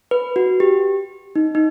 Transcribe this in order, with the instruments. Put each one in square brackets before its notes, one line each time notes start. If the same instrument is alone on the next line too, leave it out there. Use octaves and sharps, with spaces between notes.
[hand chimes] B4
F#4
G4
D#4
D#4